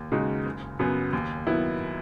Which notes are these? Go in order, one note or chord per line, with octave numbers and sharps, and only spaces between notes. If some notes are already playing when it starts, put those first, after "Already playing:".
Already playing: D#2
C#3 G#3 D#4 F#4
F#1
F#2 C#3 F#3 B3
D#2
D#3 F#3 B3 E4